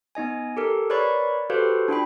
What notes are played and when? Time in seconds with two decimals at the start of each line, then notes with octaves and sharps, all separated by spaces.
0.15 B3 D#4 D#5 G#5
0.57 G4 A4 A#4
0.90 A#4 B4 C#5 D5 B5 C#6
1.50 F#4 G4 A4 B4 C5 F5
1.88 D4 F4 G5 B5